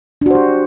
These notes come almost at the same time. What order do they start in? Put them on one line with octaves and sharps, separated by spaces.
D4 F#4 C5 G4